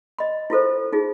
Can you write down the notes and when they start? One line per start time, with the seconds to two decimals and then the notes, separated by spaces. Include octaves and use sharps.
0.19 D#5 B5
0.50 E4 F4 A4 C5
0.92 D#4 F4 G#4